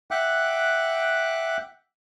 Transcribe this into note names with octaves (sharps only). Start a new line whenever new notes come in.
E5 F#5 G5 D6 F#6